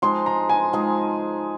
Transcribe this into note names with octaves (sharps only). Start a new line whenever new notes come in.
F3 G#3 D#4 G#4 C6
A#5
G#5
F3 G#3 D#4 G#4